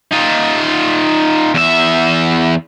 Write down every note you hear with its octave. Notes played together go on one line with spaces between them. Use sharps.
D#4 F4
E2 E5